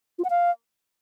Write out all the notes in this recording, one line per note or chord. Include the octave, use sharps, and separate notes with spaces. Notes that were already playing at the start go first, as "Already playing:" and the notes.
F4
F#5
F5